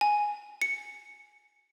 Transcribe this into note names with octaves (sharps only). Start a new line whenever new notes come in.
G#5
C#7